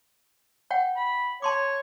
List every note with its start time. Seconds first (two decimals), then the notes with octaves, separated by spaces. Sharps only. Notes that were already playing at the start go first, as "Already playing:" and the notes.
0.71 C#5 F#5 G5
0.97 B5
1.42 C#5 A5 C6 D6